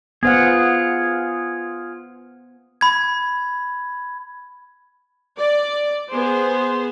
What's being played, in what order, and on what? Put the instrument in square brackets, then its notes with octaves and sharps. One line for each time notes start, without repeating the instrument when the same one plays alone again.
[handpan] B3 C5 F#5 [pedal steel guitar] F4 G#4
[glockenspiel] B5 G#6
[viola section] D5
B3 G#4 C5